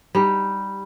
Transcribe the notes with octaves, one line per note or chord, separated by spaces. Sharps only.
G3 D#4